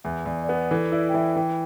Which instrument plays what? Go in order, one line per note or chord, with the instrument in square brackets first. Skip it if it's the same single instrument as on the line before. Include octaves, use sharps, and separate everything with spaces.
[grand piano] E2 [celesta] E5
[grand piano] E2 [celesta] D5
[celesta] D5
[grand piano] B3 [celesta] B4
[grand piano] E3 [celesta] A4
[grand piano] E4 [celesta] D5
[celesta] G5
[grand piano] E3 [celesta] E5
[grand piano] E3 [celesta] G5